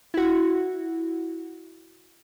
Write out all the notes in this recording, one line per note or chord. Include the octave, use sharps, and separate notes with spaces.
E4 F#4